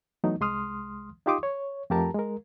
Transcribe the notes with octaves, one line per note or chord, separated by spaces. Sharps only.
E3 F#3 A3 B3 D#4
C2 G#3 C6 D#6 F6
D#4 F4 G4 C6 D6 D#6
C#5
F2 A3 G4 A#4 A5 A#5
G#3 A#4